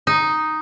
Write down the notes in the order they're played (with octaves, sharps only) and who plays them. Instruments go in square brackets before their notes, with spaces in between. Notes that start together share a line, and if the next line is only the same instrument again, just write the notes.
[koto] D#4